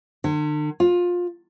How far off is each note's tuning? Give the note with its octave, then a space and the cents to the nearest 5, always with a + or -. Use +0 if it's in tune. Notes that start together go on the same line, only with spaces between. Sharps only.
D3 +45
F4 +20